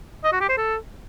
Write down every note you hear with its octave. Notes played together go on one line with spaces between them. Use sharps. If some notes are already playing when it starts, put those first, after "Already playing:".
D#5
F#4
G4
C5
A4